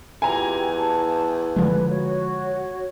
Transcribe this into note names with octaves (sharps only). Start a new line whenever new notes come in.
E2 F4 G4 G5 G#5 A#5
A5
D3 F3 G#3 B4
F#4 C#5